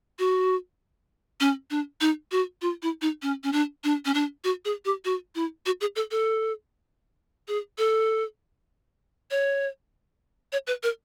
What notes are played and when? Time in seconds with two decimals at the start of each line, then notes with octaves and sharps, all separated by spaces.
0.19 F#4
1.40 C#4
1.71 D4
2.01 D#4
2.32 F#4
2.62 F4
2.83 E4
3.02 D#4
3.22 C#4
3.44 C#4
3.52 D4
3.84 D4
4.05 C#4
4.14 D4
4.44 F#4
4.65 G#4
4.85 G4
5.05 F#4
5.35 E4
5.66 F#4
5.81 G#4
5.96 A4
6.11 A4
7.48 G#4
7.78 A4
9.31 C#5
10.52 C#5
10.67 B4
10.83 A#4